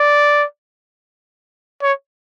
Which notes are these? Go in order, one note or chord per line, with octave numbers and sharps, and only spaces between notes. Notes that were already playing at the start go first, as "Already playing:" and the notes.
Already playing: D5
C#5